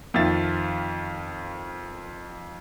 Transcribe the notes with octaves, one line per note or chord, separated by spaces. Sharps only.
F2 D#3 F4 E5 A6